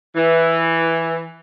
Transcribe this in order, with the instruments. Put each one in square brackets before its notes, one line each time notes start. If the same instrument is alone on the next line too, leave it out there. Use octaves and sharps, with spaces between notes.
[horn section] E3